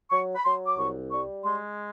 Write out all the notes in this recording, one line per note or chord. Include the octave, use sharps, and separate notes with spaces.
F#3 C#6
B5
F#3 C6
D6
C2 C#6
G3 C#6
G#3 C6